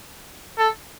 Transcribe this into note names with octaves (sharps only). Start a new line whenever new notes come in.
A4